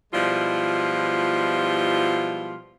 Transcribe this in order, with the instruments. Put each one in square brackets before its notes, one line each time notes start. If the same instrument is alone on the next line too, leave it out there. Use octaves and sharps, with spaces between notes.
[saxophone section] B2 F3 G3 G#3 E4 F4